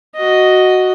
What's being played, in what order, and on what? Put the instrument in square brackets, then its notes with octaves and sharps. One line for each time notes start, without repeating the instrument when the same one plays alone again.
[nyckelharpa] F#4 D#5